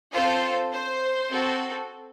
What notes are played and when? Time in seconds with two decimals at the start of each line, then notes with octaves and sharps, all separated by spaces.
0.12 C4 F4 A4 C5
0.71 C5
1.30 C4 F#4 A4